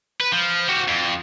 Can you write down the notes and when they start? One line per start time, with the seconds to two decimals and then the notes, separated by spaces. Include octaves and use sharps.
0.20 B4
0.32 F3
0.69 F#4 G4
0.88 F2